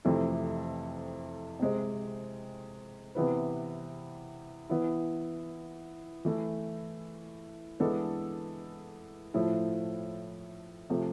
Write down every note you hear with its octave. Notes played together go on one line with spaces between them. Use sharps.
F2 C3 E3 A3 E4
C3 G#3 C4
C3 E3 B3 E4 B4
E3 B3 E4
E3 A3 E4
E3 G#3 B3 D4 A4
A2 F3 A3 E4
C3 F3 A3